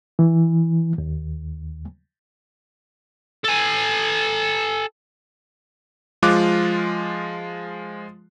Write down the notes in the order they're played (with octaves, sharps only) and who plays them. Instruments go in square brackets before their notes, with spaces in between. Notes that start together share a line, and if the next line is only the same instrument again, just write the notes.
[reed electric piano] E3
D#2
[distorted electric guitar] A4 G#5
[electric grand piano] F3 G#3 F4 D6 F#6